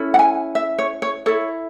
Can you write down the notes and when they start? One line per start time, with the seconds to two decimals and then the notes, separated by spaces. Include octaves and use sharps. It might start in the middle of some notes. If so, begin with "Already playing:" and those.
Already playing: C#4 E4 A4
0.14 F#5
0.19 G#5
0.55 E5
0.79 C#5
1.02 C#5
1.26 E4 A4 C#5